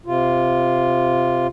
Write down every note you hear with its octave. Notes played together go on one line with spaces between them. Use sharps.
C3 F4